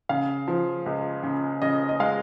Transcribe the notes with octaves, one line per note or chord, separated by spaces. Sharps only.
C#3 F5
F3
C#2
C#3
C#3 D#5
D#5
G#3 F5